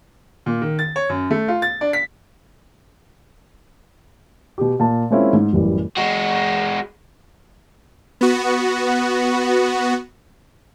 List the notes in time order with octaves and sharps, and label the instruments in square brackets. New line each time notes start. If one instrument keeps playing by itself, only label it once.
[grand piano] A#2
D#3
A6
C#5
F#2
A3
F4
A6
D4
B6
B2 G4
A#2 A5
G#3 A#3 C4 C#4 E4 F4
G#2
A1 F#2 E3 G3
[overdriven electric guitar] G#3 F#4
[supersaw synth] B3 F#4